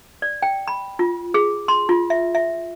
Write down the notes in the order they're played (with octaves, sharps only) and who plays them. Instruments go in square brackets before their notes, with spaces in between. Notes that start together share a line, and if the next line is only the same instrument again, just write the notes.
[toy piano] D5
G5
B5
F4
G#4
C6
F4
E5
E5